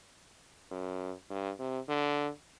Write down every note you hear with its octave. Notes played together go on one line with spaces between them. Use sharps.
F#2
G2
C3
D3